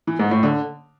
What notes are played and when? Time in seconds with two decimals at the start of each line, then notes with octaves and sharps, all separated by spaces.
0.07 E3
0.19 G#2
0.31 A2
0.43 D3